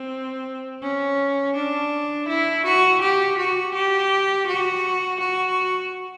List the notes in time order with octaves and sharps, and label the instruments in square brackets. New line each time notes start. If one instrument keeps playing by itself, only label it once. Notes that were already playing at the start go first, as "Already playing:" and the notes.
Already playing: [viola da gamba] C4
C#4
D4
E4
F#4
G4
F#4
G4
F#4
F#4